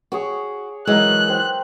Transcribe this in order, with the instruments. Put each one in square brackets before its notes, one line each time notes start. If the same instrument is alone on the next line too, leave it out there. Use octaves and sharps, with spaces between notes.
[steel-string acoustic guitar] F#4 [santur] G#4 C#5 D6
[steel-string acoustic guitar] E3 F#3 G#3 [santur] A#4 E5 [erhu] F#6
[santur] C5 G5